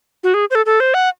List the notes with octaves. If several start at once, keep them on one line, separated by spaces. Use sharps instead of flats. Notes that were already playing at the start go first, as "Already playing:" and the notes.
F#4
G#4
C5
A4
A4
C5
F#5